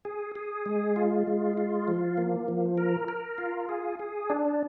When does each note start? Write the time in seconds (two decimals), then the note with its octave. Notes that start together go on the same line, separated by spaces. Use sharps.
0.05 G#4
0.35 G#4
0.66 G#3
0.96 F4
1.27 G#3
1.57 F4
1.88 F3
2.17 A#3
2.48 F3
2.78 A#4
3.08 A#4
3.38 F4
3.69 G#4
3.99 G#4
4.30 D4